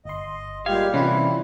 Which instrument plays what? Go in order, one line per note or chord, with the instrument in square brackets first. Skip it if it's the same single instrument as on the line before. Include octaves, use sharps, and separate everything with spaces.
[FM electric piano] G1 C6 [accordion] D#5
[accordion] A#2 G#3 G4 [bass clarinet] G3 [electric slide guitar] F5 [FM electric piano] G#6
[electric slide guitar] C3 E3 [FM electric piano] C#4 F4 [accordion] E4